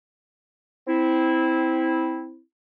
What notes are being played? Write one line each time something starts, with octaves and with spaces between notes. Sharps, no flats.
C4 E4